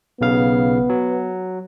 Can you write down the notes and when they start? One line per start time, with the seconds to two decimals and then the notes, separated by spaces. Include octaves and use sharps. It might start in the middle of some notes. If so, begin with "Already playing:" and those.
0.21 B1 C#3 B3 F5
0.89 F#3